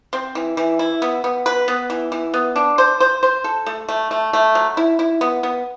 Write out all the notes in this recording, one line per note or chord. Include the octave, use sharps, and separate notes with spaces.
C4
E3
E3
E4
B3
B3
B4
B3
E3
E3
B3
D4
C5
C5
C5
A4
A3
A3
A3
A3
F#3
E4
E4
B3
B3